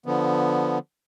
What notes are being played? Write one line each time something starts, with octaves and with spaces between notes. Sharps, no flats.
D3 F3 B3